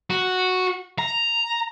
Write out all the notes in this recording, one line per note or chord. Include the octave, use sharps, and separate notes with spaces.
F#4
A#5